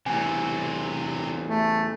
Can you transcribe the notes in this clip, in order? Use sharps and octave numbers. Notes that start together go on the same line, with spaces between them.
E2 A2 C3 F#4 G#5
A3